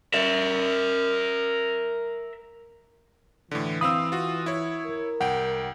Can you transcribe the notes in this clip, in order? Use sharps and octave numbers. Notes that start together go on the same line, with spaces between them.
A#4 E5
A2 D3 E3
C4 F5 B5 D#6 E6
F4 F#4
E4 C#5
A#4
C2 F#5 G5